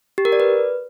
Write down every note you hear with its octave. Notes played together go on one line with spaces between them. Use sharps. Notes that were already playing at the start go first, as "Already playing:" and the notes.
G4
A#4
D5
B4